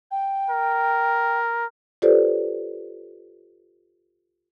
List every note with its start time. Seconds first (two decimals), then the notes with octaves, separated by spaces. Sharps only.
0.11 G5
0.50 A#4
2.02 F4 G4 A4 B4 C5 D5